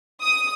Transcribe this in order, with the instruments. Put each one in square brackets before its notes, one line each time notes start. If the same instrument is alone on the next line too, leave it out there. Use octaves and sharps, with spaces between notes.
[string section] D#6